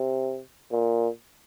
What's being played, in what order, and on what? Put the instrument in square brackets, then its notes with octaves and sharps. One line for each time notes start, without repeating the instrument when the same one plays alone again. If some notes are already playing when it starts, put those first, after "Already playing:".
Already playing: [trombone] C3
A#2